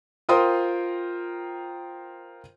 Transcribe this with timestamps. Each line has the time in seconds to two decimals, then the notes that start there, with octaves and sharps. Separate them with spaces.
0.29 F4 A#4 C5 G5 C6 D#6